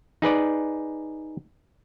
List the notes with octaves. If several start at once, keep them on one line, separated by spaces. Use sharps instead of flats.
D#4 G#4 B4 D5